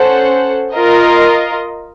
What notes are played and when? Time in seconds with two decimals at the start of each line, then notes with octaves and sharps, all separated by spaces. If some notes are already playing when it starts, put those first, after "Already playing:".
Already playing: C#4 A4 C5 F#5
0.72 F4 A#4 D#5